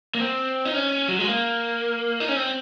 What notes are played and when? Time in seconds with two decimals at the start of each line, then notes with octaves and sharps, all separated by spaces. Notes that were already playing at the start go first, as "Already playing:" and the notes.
0.15 A#3
0.20 C4
0.65 D#4
0.74 C#4
1.09 F#3
1.19 G#3
1.28 A#3
2.20 D#4
2.28 C#4
2.36 C4